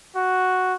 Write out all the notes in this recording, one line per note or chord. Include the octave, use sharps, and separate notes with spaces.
F#4